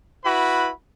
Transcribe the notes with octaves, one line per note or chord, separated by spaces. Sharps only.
E4 F#4 B4 B5